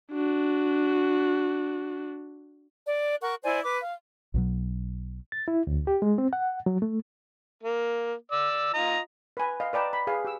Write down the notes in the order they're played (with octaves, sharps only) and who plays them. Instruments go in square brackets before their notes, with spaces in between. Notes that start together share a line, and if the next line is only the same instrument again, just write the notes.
[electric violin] D4 F#4
[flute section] D5
A#4 F#5 C#6
E4 C5 D5 G#5
B4 D6
F5
[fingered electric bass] B1 B2 F#3
[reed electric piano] A6
E4
D2
G4
G#3
C4
F#5
F#3
A3
[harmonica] A#3
D5 E6
F4 D#5 A#5
[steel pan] B4 G#5
D#5 F5
B4 D5 G5 A5 A#5
B5
G#4 B4 F5 G#5
G4 E6